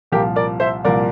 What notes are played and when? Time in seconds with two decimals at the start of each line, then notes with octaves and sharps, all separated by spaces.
0.12 C2 A#2 F3 G4 A#4
0.36 A#4 D5
0.60 C5 E5
0.84 C2 A#2 F3 A#4 D5